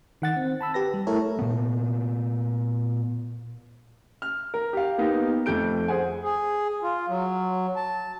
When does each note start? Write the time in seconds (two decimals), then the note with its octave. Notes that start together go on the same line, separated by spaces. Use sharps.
0.22 D#3 F#5 A6
0.36 C4
0.61 A5 B5 E6
0.74 G4 B4 A#6
0.94 G3
1.07 A3 E4 A4 A#4 C#5
1.39 A#2 B3
4.22 F6
4.54 A#4
4.73 G4 F5
4.98 A#3 B3 D#4 G4 F5
5.46 F2 A3 G6 D7
5.88 G#4 C5 F#5 G#5
6.24 G#4
6.83 F4
7.09 F#3
7.76 A5